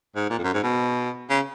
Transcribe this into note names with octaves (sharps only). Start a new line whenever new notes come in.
G#2
A#2
F2
F#2
G#2
B2
C#3